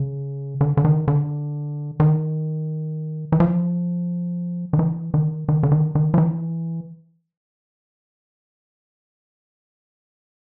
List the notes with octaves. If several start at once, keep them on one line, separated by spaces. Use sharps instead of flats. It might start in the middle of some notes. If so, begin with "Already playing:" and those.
Already playing: C#3
D3
D3
D#3
D3
D#3
E3
F3
D#3
E3
D#3
D#3
D3
D#3
D#3
F3
E3